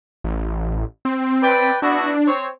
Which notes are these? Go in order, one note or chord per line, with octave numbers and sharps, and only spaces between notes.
A1
C4
B4 D5 G5
B3 D4 E4 F#4
C4 C#5